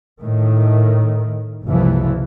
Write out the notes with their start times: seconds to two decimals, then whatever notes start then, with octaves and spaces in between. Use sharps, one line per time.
0.22 A2 D#3
1.66 F#1 C2 E3 F3